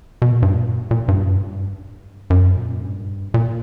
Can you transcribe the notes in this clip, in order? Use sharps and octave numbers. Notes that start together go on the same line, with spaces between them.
B2
A#2
G2
A#2
A#2
G2
F#2
G2
F#2
A#2
G2
A#2